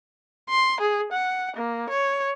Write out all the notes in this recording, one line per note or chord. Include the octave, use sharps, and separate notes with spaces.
C6
G#4
F#5
A#3
C#5